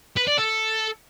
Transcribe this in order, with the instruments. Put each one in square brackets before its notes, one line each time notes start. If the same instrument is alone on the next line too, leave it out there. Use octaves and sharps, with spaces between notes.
[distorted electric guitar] B4
D5
A4